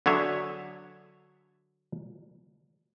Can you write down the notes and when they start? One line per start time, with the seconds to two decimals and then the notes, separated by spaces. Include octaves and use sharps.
0.06 D3 F#3 G#4 C#5 E5